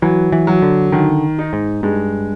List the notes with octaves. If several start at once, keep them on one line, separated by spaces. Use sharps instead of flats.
E3 F#3
E3
F#3
D3
D3 D#3
D#4
G#2
G2 G#3